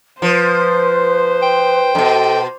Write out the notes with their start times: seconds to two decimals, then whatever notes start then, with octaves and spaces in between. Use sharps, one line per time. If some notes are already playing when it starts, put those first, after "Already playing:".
0.22 F3 B4 C5
1.42 G5
1.95 F#2 B2 A4